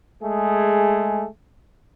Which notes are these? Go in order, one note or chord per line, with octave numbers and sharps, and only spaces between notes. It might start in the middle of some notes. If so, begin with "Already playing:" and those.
G#3 A3 G#4